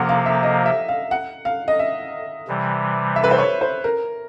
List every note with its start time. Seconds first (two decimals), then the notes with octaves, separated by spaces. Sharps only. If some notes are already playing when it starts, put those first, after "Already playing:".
Already playing: C3 F3 A#3 F#5
0.09 F5
0.26 E5
0.43 D#5
0.66 E5
0.89 F5
1.11 F#5
1.45 F5
1.68 D#5
1.79 E5
2.48 C3 E3 G3
3.16 E5
3.24 B4
3.31 C5
3.39 C#5
3.61 C5
3.84 A#4